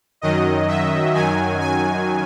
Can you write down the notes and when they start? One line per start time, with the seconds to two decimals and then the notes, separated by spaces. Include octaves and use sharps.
0.21 F#2 D#3 F#3 D#5
0.68 E5
1.14 F#2 D#3 F#3 G#5
1.61 G#5